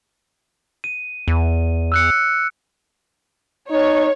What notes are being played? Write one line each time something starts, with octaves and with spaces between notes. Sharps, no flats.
D#7
E2
E6 F#6 C#7
D#4 C#5